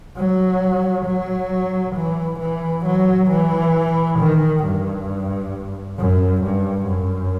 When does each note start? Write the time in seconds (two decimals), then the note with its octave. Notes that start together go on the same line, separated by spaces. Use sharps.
0.17 F#3
1.06 F#3
1.96 E3
2.40 E3
2.86 F#3
3.30 E3
4.19 D#3
4.65 G2
5.99 F#2
6.43 G2
6.88 F#2